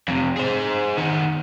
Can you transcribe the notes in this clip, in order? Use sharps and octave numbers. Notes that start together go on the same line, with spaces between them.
F2 C3
G#4 C5
D#3 B3